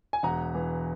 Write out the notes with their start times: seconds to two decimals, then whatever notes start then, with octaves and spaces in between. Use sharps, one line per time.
0.13 G#5
0.23 E1 F#5 A#5
0.55 E3